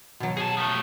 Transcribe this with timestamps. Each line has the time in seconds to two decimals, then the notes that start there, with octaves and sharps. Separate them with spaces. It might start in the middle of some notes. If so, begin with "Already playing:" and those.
0.20 B2 F#3
0.37 G#4 A5
0.57 F3 A3